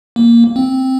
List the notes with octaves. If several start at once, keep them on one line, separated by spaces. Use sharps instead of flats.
A#3
C4